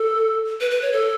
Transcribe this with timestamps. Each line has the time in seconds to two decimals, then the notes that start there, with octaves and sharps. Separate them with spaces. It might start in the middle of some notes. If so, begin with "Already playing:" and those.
Already playing: A4
0.61 B4
0.71 B4
0.82 C#5
0.93 A4